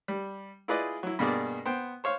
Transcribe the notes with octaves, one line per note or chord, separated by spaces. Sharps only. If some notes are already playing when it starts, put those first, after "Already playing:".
G3
E4 F4 G#4 B4 D5 D#5
F#3 E4
G2 B2 A#3 D4 G#4 D5
B3 C5 G5
C5 C#5 F5 C#6